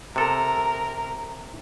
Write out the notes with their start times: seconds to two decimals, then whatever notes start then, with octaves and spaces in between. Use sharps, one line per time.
0.16 C3 A4 A#4